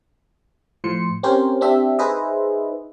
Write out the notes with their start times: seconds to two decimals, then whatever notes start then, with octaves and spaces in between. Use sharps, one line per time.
0.84 A2 F3 C6 C#7
1.23 C4 C#4 G4 A#4 C5 C#5
1.61 C4 D4 G4 E5
1.98 D#4 G#4 B4 C5 D#5 E5